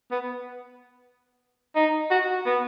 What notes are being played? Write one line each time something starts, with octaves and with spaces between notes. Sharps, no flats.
B3
D#4
F#4
B3